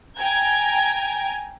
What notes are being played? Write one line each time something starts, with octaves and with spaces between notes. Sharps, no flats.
G5 G#5 A#5 G#6